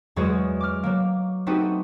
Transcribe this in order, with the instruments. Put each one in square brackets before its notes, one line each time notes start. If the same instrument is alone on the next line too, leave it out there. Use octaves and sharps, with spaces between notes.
[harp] E2 F#3 G#3 F#4 C#5 D#6
D6 F6
F#3 A#3
A3 B3 C4 D#4 F#4 G4